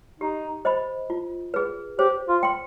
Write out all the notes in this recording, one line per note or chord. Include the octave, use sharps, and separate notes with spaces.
D#4 G4
C5 D#5 B5
F4
G#4 B4
G4 C5
F4
G5 C6